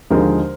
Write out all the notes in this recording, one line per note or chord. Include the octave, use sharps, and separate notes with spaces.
D#2 D3 F3 G#3 A#4 C5